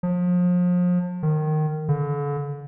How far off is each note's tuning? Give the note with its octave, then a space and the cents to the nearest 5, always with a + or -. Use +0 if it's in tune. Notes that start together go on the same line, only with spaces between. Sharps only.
F3 +35
D#3 -15
D3 -40